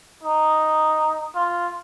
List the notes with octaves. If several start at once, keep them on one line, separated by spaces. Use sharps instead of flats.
D#4
F4